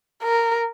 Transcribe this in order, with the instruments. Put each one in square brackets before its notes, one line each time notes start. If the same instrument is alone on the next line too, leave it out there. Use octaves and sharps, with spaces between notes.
[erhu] A#4